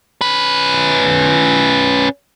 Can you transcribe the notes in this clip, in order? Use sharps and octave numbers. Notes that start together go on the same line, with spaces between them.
C#4 B4